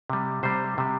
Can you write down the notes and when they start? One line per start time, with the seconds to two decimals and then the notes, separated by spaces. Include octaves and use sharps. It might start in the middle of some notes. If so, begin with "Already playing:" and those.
0.10 C3 G3
0.43 C3 G3 C5
0.78 C3 G3